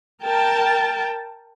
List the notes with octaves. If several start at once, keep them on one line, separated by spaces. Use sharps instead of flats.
A#4 G5 A5